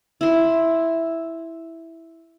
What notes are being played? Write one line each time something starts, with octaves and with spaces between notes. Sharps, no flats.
E4 C6